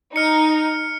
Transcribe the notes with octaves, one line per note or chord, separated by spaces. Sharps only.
D#4 F6 C#7